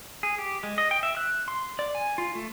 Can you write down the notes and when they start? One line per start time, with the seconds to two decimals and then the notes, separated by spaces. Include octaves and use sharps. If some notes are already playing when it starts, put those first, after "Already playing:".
0.23 G#4
0.38 G4
0.63 G#3
0.78 D#5
0.91 G5
1.03 E5
1.17 F#6
1.48 C6
1.79 D5
1.95 G#5
2.18 F4
2.35 A3